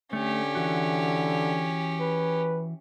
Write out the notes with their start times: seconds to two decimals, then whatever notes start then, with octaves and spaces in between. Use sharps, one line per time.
0.13 D3 A3 C#4 G4
0.55 E3 F#4
2.00 B4